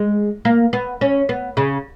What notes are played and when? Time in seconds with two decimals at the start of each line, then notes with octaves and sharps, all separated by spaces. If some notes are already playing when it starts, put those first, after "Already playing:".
Already playing: G#3
0.45 A#3
0.73 B3
1.01 C#4
1.29 B3
1.57 C#3